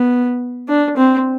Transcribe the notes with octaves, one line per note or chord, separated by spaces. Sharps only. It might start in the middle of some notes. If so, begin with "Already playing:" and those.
Already playing: B3
D4
C4